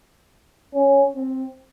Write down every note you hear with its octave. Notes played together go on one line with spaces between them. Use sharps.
C#4
C4